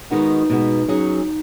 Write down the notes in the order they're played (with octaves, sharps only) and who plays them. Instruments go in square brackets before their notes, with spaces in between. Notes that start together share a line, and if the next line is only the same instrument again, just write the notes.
[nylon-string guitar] D#3 G#3 B3 F#4 [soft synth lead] D#4
[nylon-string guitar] B2 G#3 B3
[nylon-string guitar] F#3 C#4 G#4 [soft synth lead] D#4